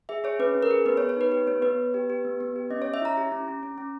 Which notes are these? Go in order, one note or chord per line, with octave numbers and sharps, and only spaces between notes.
G#4 E5
G#4 C#5
C#4 B4
C#4
A#4
G#4
B3 B4
C#5
B3
C#5
D#4 B4
G4 B4
B3 C#5
B3 B4
B3
G4
G4
B3
B3
G4
C#4 D#5
C#4 C#5
E5
E4 A#5
G4
C#4
C#4
C#4
C#4